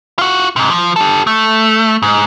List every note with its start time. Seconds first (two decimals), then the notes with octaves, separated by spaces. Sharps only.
0.19 F4 F#4
0.56 G#2 C3
0.70 F3
0.96 G4 A4
1.27 A3
2.02 G#2